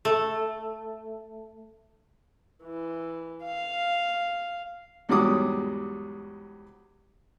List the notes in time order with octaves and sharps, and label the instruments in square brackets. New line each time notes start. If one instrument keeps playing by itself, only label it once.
[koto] A3
[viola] E3
F5
[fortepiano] E2 G#2 F#3 G3 D6 D#6